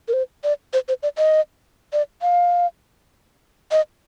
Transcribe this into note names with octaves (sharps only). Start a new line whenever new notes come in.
A#4
C5
D5
C5
C5
D5
D#5
D5
F5
D#5